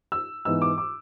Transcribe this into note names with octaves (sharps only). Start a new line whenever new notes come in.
E6
G#2 E3 B3 E6
D6
D6